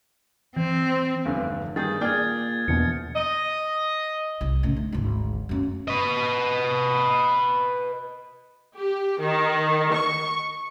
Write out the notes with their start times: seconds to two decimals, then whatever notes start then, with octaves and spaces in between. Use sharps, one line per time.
0.56 E3 C4
1.25 F1 E2 G2 D3
1.76 G2 D#3 G#4 G6 A6
2.01 A#2 G#4 D5 G5 F6 G6 G#6
2.68 A#1 E2 B2 C#7
3.16 D#5
4.41 C2
4.63 A2 C#3
4.77 D3
4.92 G#1 D2
5.49 F#2 A#3
5.88 B4 D#5
8.76 G4
9.20 D#3
9.92 C#6